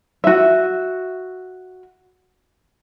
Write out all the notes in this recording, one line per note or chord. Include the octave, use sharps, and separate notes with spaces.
F#4 E5